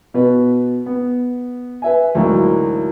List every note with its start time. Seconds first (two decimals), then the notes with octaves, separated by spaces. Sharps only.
0.14 B2 B4
0.86 B3
1.82 B4 E5 G#5
2.15 D2 G#2 E3 F#3 A#3